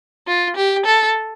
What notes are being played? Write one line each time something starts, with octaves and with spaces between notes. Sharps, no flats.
F4
G4
A4